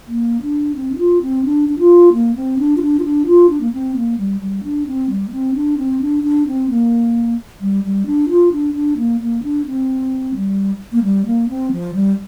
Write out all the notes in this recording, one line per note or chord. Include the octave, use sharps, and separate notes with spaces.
A#3
D4
C4
D4
F4
C4
D4
D4
F4
A#3
C4
D4
F4
D4
F4
D4
F4
D4
A#3
C4
A#3
G3
G3
D4
C4
G3
A#3
C4
D4
C4
D4
D4
C4
A#3
G3
G3
D4
F4
D4
D4
A#3
A#3
D4
C4
G3
A#3
G3
A#3
C4
F3
G3